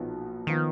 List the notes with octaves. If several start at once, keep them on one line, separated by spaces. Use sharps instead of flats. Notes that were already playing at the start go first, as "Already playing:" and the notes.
Already playing: B1 A#2 F3 B3 D#4
D#3 F3 B3